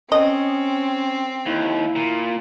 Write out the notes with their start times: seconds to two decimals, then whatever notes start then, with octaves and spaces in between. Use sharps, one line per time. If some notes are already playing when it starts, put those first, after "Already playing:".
0.12 C4 C#4 D#5
1.46 D#2 E4
1.96 A#2